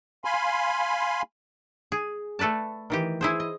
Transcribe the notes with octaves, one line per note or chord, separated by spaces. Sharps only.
F5 G#5 B5 C6
G#4
A3 A4 B4 D5 A5
D#3 E3 G4
E4 G#4 C5
D#5